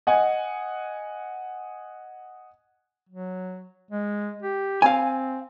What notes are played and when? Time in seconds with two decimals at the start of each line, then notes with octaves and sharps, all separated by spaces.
0.07 D#5 F#5 G#5
3.09 F#3
3.91 G#3
4.42 G4
4.82 C4 F5 G#5